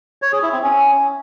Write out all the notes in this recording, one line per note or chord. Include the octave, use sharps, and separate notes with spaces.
C#5
G#4
E4
C4
C#4